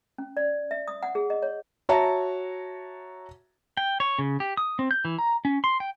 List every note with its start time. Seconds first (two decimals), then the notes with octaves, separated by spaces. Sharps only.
0.18 C#4
0.37 D5
0.71 E5
0.88 D#6
1.03 F#5
1.15 G#4
1.30 D#5
1.43 C#5
1.89 F#4 C#5 E5 A5 A#5
3.77 G5
4.00 C#5
4.19 C#3
4.40 G4
4.57 D#6
4.79 C4
4.91 G6
5.05 E3
5.19 A#5
5.45 C#4
5.64 C6
5.80 G5